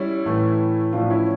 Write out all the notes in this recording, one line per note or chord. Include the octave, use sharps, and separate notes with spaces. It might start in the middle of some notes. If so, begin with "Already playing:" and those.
Already playing: G3 C#4 E4
A2 E3 A3
A2 F3 A3 D4 F4
C#4 E4